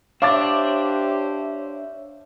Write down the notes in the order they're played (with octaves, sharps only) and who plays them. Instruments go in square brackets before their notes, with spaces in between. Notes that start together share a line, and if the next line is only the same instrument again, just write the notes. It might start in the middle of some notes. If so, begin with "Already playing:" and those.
[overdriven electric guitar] D4 [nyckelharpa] G4 C5 [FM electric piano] C#5 E5 [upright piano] F5 D6 A6